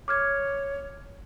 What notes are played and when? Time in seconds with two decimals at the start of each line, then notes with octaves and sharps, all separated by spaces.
0.08 C#5 D6 F6 G#6